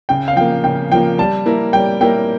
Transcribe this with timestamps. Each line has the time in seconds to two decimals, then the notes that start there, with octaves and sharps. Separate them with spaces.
0.09 C#3 G5
0.28 F5
0.36 F3 A#3 G5
0.64 C#3 G5
0.91 F3 A#3 G5
1.18 G3 A5
1.46 A#3 E4 A#4
1.73 G3 G5
2.01 A#3 E4 A#4 G5